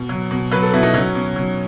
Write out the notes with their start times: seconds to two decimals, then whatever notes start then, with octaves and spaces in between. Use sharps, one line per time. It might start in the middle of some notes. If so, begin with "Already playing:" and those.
Already playing: B2
0.09 F#3
0.31 B2
0.52 F#3 B4
0.63 A4
0.74 B2 E4
0.83 D#4
0.94 F#3 C#4
1.15 B2
1.36 F#3